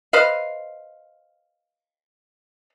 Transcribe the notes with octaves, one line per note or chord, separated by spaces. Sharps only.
B4 C5 D#5 F5